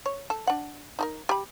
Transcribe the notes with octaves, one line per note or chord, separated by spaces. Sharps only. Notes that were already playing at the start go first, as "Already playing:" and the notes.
C#5
A4
D4 F#5
D#4 A4 A#4
G4 B5